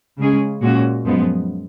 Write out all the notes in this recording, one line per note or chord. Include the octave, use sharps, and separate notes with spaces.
C#3 G#3 C#4 G#4
A#2 G#3 C#4 F#4
F#2 F3 G#3 B3